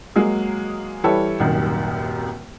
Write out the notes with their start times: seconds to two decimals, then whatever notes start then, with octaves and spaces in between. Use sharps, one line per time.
0.16 F#3 G#3 A#3 G#4
1.04 E3 G3 E4 A4 B4 C#5
1.40 D#1 C2 F#2 D#3